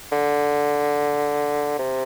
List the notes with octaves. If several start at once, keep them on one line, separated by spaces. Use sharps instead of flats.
D3
C3